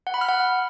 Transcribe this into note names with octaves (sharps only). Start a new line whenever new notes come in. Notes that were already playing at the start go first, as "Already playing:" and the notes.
F#5
B5
F6
F#5